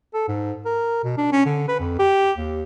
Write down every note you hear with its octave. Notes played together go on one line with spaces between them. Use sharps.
A4
G#2
A#4
B2
D4
C#4
D3
B4
F2
G4
D#2